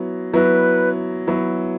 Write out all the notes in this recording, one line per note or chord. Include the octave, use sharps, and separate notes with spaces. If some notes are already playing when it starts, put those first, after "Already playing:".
Already playing: F#3 B3 E4
F#3 B3 E4 B4
F#3 B3 E4